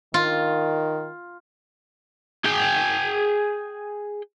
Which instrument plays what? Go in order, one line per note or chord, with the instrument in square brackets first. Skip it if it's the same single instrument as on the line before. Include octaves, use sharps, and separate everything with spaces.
[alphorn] D#3 [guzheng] F4
[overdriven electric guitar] G#4 G5